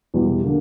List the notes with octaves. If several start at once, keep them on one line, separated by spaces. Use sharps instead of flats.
E2 B2 G3
D3 A#3